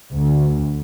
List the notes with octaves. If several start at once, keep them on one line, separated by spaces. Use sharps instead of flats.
D2